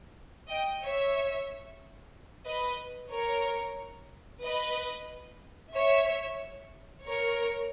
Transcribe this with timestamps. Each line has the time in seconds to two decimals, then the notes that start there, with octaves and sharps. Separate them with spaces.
0.49 D#5 G5
0.82 C#5 E5
2.45 B4 D#5
3.10 A#4 C#5
4.42 B4 D#5
5.73 C#5 E5
7.04 A#4 C#5